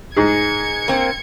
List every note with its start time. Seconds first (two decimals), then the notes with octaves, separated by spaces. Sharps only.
0.16 G#2 G#4 G#6 C#7
0.88 A#3 C4